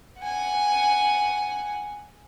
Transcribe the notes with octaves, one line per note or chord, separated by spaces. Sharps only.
F#5 G#5